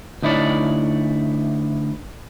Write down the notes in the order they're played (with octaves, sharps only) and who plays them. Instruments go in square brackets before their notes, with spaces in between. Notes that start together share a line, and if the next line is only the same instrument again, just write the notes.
[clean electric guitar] D2 D#4 E4 C#5 D5